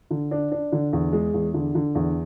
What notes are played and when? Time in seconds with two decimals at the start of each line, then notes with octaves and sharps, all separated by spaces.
0.11 D3
0.31 D4
0.52 D4
0.72 D3
0.93 E2
1.13 G#3
1.34 E2
1.54 D3
1.75 D3
1.95 E2